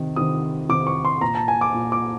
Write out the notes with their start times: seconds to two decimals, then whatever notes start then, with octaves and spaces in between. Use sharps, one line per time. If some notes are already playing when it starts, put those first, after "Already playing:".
Already playing: C3 D#3
0.16 C3 D#3 D#6
0.69 C3 D#3 D6
0.87 C#6
1.05 C6
1.21 A#2 A#5
1.35 A5
1.48 G#5
1.61 D6
1.74 A#2
1.92 D6